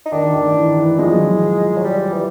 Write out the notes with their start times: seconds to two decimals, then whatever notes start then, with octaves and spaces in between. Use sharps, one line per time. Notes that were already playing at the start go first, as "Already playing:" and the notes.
0.06 D#4
0.12 D#3 D4
0.34 D#3
0.55 E3
0.77 E3
0.98 F3 G#3
1.07 F#3
1.14 F3
1.78 F#3
1.84 G3
2.13 E3